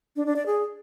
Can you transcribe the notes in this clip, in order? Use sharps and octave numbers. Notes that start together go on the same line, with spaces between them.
D4
D4
D5
G#4